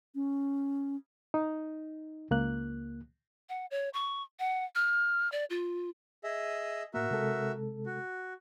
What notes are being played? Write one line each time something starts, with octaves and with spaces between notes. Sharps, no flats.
C#4
D#4
C#2 A#3 F#6
F#5
C#5
C#6
F#5
F6
D5
F4
G#4 D#5 E5
A2 A#3 F#4 A#4 E5
C3 G#3 A4
F#4